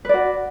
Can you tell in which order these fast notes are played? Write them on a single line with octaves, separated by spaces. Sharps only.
B4 D5 F#4